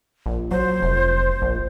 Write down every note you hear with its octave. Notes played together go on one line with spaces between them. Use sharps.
A#1
F#3 C5
F1
A#1